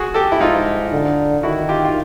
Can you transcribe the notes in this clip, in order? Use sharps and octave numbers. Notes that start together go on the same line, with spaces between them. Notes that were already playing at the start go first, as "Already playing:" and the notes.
Already playing: F#4 G#4
G4 A4
E4
G#2 D#4 F4
D3
D#3 E4 F#4
F4 G4
F4